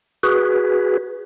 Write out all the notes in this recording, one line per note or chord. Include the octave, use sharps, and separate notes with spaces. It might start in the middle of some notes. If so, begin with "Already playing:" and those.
F#4 G#4 B4